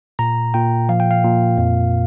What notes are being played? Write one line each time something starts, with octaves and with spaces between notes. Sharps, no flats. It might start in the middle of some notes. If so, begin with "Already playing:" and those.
A#2 A#5
A#2 G5
F3 F5
G5
F5
A#2
F2